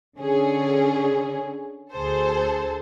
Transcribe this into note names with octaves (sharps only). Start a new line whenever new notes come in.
D3 C#4 G#4
D2 G#4 A4 C5